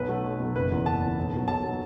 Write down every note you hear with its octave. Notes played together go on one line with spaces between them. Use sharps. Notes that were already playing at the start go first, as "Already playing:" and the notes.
Already playing: B1 B4
B2 F#3 A3
B1
B2 F#3 A3
F#1 B4
E2 E3
F#1 A5
E2 E3
B1
B2 F#3
B1 A5
B2 F#3